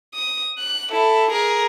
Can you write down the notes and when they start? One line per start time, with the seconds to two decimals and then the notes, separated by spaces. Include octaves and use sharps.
0.15 D#6
0.59 F#6
0.91 E4 A4
1.31 G#4 A#4